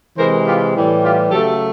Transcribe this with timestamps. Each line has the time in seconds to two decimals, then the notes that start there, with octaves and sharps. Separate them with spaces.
0.17 C3 E3 G#3 A#4 C5
0.46 F4 G4
0.75 A2 E3 G3
1.03 F4 G4
1.30 C#3 F#3 A3 G4 A4